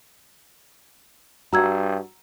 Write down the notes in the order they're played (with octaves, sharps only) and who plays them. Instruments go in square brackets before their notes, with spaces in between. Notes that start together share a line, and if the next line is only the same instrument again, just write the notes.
[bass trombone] G2 [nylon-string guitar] F#4 [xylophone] A#5 E6 G#6